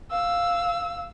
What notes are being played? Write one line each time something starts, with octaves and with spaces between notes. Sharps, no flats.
F5 E6